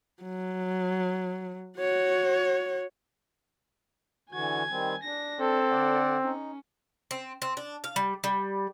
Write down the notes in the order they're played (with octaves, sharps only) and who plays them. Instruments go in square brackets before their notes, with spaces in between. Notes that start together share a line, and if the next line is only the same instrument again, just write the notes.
[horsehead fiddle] F#3
F#4 C#5
[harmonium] D3 E3 F#4 [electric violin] G#5 G#6
[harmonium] D#3 G3 C4
[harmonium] D4 [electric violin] A#6
[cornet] C4 [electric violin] A4
[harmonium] D3 D5 F#5
[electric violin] C#4 [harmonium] D#4
[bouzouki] C4
C4
D4
F5
G3
G3